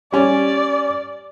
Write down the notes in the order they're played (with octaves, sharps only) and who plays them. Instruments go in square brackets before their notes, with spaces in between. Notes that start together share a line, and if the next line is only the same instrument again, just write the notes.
[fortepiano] G3 C#4 [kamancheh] D5